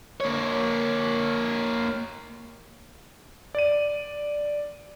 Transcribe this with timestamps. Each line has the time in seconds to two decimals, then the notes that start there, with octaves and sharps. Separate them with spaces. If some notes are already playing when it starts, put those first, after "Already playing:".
0.20 A#3 C#5
3.55 D5 D#7